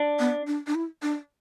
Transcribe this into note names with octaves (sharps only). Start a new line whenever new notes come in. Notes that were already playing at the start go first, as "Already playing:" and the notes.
Already playing: D4
B3
D4
D4
E4
D4